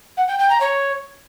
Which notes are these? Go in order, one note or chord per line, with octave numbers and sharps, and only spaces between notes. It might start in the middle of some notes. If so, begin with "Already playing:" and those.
F#5
G5
G5
A#5
C#5